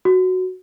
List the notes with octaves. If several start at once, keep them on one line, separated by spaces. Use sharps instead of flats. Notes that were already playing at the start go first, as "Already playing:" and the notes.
F#4